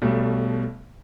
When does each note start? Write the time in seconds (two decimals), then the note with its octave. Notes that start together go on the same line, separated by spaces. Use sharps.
0.02 B1 B2 G3 A3